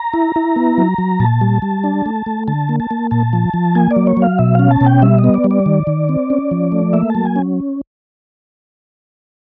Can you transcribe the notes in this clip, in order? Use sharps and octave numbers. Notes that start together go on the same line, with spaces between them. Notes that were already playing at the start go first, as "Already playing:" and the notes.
Already playing: A#5
E4
E4
B3
F#3
F#3
A#2 A5
G3
G3
D4
A3
A3
D3 A5
A#3
A5
A#3
A#2 A5
F3
F3
A#3 G#5
D5
F#3
C#5
F#3
F5
B2 E5
C#4 F5
A5
B2
G5
G3 E5
D#5
B3
D5
G3
D5
D#3
D#3
C4
C#4
F3
A3
A#3 E5
F#3 A5
G#5
C#4